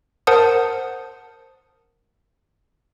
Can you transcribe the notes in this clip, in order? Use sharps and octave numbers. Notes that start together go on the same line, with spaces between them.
A#4 C5 F#5 A5 D#6